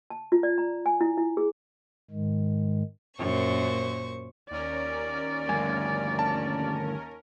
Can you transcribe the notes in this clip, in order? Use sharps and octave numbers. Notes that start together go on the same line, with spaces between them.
A5
F4
D5
A#5
G#5
E4
E4
G#4
G#2 D#3 G#3
F#2 A#2 C5 C#6
D#2 C#4 A#4 D5
D2 G2 G#5
A5